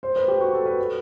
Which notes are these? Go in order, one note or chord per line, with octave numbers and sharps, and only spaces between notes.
C5
B4
G4
F#4
A4
B4
B4